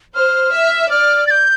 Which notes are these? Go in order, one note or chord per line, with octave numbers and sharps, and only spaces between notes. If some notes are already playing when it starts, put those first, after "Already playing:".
C5 F6
E5
D5 F6
A6
G6